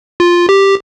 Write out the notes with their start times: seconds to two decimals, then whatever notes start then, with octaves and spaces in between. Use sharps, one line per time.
0.20 F4
0.49 G4